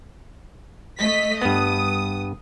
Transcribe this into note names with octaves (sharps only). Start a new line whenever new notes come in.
A3 D#5 B6
G2 B3 D#6